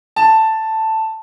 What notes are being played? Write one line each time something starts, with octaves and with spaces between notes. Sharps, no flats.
A5